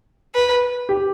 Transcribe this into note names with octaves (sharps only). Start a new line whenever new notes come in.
B4
G4